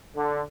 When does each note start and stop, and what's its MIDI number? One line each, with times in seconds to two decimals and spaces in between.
0.15 0.41 50